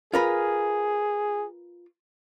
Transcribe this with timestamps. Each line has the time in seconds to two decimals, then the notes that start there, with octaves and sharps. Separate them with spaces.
0.14 F4 G#4 A#4 B4